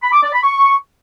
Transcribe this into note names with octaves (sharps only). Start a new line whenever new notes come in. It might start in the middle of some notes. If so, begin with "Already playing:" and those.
B5
D6
D5
B5
C#6